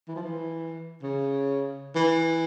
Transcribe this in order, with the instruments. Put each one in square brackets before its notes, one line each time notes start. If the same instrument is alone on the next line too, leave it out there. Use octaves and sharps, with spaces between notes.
[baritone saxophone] E3
F3
E3
C#3
E3